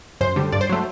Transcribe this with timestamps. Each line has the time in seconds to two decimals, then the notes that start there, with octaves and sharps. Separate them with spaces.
0.21 F#2 C5
0.36 D3 G3
0.52 G2 D5
0.61 C5
0.69 F#3 A3